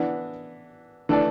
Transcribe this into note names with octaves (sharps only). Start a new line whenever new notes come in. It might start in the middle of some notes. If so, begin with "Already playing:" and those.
Already playing: E3 B3 D4
E3 A3 D4 A4 D5